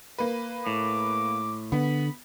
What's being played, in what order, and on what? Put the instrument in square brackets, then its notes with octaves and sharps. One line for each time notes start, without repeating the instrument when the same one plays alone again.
[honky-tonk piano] A#3 B4
[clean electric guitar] A2 [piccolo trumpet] D6
[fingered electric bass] D3 [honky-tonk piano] B3 [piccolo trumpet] B5